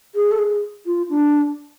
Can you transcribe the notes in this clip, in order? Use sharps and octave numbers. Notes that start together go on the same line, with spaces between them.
G#4
A4
G#4
F4
D4